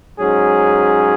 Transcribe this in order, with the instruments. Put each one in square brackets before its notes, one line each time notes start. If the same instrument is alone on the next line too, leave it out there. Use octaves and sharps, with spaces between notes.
[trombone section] G#2 F#3 C#4 G#4